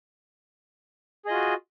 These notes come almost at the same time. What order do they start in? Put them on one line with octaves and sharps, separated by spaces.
G#4 D#5 F4 F#4